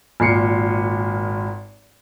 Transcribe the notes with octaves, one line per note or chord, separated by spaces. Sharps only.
G#1 A#2 C7 C#7